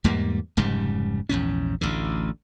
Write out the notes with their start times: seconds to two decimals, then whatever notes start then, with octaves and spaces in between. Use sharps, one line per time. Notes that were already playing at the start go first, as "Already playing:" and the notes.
0.04 E2 G#2 G3 A#3
0.57 F1 G#2 C#3 G3
1.29 A#1 E2 G#2 C#4
1.81 A1 D2 D3